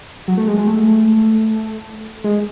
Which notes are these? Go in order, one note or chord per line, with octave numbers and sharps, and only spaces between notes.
F#3
A3
G#3
G#3
A3
G#3